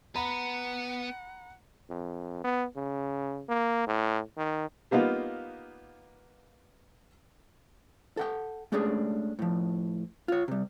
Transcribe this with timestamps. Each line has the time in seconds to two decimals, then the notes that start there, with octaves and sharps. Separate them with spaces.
0.15 B3 F#5 A#5 B5
1.90 F2
2.44 B3
2.76 C#3
3.49 A#3
3.87 A2
4.37 D#3
4.91 G3 A#3 B3 D#4 F4
8.17 A4 F#5 G5
8.72 G#3 A3 C#4 D4 G4 G#4
9.39 A2 F3
10.28 F4 C#5
10.48 C3 G3